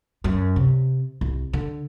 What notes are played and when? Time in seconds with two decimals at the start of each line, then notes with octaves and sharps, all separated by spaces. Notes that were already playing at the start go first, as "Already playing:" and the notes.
0.24 F#2
0.56 C3
1.21 C2
1.53 D3